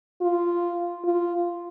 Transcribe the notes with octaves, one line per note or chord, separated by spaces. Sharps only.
F4
F4